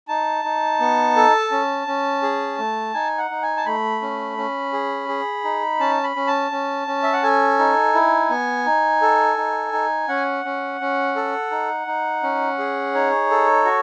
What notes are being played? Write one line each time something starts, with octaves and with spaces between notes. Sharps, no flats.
D#4 A5
D#4
B3
A4
C#4
C#4
G#4
A3
D#4 G#5
F#5
D#4
G#5
A5
A3 B5
C#4
C#4
G#4
G#4
D#4
C#4 A5
B5
C#4
A5
C#4
C#4
E5
F#5
A4 G#5
D#4
E4
B3
D#4
A4
D#4
D#4
C#4 F#5
C#4
C#4
A4
D#4
D#4
C#4
G#4
D#4 C#5
A4
F#4